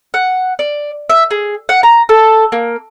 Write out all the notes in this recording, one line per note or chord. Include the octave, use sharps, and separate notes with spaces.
F#5
D5
E5
G#4
F#5
A#5
A4
A#3